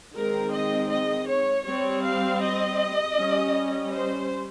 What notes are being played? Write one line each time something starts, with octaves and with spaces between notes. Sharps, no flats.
D#3 G#3 C4 A#4
D#5
D#5
C#5
G3 C4 C#5
F5
D#5
G3 C#4
C5